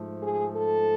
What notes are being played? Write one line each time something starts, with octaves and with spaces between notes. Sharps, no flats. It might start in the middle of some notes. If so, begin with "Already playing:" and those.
Already playing: G#2 F3 A3
G#4
A4